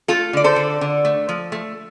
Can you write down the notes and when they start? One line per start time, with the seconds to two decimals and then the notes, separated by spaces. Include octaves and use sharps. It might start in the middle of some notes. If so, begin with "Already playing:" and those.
0.08 A3 F4 A4
0.33 D3 D5
0.44 A4 C5
0.56 D3
0.81 D3
1.05 A3
1.29 F3
1.52 A3